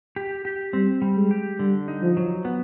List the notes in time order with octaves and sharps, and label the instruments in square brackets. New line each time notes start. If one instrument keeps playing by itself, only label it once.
[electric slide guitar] G4
G4
[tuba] G3 [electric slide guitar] C4
[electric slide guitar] G3
[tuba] G#3
[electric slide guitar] G4
[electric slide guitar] D3 [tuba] G3
[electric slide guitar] D#4
[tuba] F3
[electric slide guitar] F#3
B3